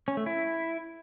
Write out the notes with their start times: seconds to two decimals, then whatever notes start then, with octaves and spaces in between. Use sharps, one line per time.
0.08 C#4
0.17 A3
0.26 E4